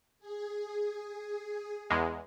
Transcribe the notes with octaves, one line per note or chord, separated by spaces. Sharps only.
G#4
E2 G#3